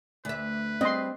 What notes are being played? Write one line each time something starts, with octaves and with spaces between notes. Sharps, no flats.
D2 B4 E5
G3 C4 D#5 C6